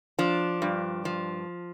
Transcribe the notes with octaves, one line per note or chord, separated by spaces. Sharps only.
F3 D4
G2
F3